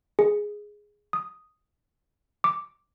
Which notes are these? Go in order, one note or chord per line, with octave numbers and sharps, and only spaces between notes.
G#4
D#6
D6